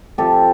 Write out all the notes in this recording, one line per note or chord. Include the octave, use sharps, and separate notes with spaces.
C3 F3 G4 A4